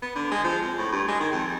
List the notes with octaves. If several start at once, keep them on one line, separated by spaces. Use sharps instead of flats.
B3
D3
G#3
F3
F2
A2
G2
G#3
D#3
F2